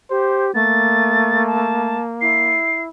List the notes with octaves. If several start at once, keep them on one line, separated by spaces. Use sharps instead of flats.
G4 C5
A3 A#3 A6
A5
E4 C7